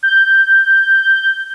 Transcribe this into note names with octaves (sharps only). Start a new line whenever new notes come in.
G6